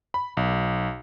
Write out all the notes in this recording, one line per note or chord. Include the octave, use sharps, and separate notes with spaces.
B5
B1